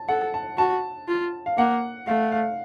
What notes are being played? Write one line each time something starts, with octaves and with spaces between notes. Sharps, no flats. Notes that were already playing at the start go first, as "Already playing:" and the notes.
Already playing: A5
A4 F#5
A5
F#4 A5
F4
F5
A#3 F#5
A3 F5
F5